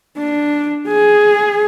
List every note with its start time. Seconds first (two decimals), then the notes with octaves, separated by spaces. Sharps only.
0.17 D4
0.88 G#4